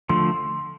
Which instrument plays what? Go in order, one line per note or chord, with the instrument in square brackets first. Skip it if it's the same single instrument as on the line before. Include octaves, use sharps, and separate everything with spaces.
[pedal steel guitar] D3 F3 A3 [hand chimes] C6